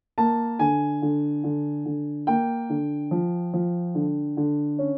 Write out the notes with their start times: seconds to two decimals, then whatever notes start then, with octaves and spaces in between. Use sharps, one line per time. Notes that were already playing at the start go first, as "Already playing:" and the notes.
0.18 A#3 A5
0.59 D3 G#5
1.02 D3
1.44 D3
1.86 D3
2.27 A#3 G5
2.70 D3
3.11 F3
3.53 F3
3.95 D3
4.37 D3
4.79 C#4